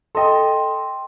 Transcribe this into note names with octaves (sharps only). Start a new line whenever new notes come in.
A4 D#5 G5 C6